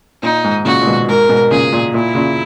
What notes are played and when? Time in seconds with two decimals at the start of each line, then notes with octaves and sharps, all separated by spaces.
0.23 A#2 D#4
0.44 G#2
0.65 A#2 C#3 F#4
0.82 A#2
0.86 G#2 B2
1.09 G#2 A#4
1.29 G#2 B2
1.51 A#2 C#3 G#4
1.72 A#2
1.94 A#2 E4
2.15 A#2 C#3